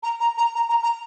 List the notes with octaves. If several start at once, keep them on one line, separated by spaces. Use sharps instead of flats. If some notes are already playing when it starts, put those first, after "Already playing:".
A#5
A#5
A#5
A#5
A#5
A#5